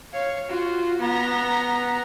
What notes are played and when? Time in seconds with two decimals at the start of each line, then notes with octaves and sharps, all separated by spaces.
0.13 C#5 F5
0.49 F4 F#4
1.00 B3 A#5